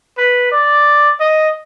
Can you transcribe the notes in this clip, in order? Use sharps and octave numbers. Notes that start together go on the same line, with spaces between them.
B4
D5
D#5